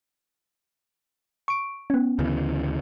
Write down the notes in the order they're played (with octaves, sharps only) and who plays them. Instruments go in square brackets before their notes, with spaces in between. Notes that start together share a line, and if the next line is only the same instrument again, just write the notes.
[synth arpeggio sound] C#6 D7
B3 C#4
[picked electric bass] D2 C#3 E3